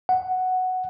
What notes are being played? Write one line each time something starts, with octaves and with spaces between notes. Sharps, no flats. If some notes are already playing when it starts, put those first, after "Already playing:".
F#5